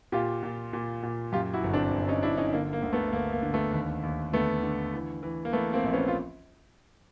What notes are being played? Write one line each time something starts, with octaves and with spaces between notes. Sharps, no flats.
A#2 F4 G4
A#2
A#2
A#2
F#2 F4 G4
E4 F#4
G1
C4 D4
G1
C#4 D#4
G1 D4 E4
C#4 D#4
D3 A#3
A#3
D2
A3 B3
D2 A#3
A#3
D3
A3 B3
D#2
D#2
D3 A3 B3
D3
E3
E3
A#3
E3 A3 B3
A#3 C4
A#1
B3 C#4
F4